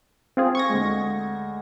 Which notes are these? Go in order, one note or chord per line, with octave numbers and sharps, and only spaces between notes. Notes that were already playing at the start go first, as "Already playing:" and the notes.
C4 F4 G#4
C#6 G#6 A#6
D2 G#3